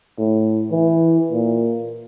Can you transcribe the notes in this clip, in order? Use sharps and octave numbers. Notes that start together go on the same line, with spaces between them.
A2
E3
A#2